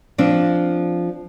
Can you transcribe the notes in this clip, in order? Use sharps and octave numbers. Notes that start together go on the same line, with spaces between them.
F3 C4 D4